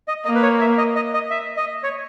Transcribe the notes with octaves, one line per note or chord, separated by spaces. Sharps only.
D#5
A#3 D#5
B4
C#5
E5
D#5
D#5
D#5
E5
D#5
C#5